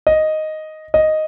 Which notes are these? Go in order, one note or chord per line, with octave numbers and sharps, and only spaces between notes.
D#5
D#5